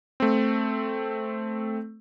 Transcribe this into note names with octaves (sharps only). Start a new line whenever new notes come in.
A3 C4